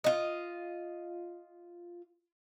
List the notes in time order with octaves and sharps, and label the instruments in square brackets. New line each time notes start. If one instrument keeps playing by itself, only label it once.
[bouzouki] F4 D#5